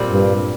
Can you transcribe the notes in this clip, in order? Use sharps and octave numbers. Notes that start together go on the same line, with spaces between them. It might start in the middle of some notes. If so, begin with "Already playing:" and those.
Already playing: A#2 G3 C4
G2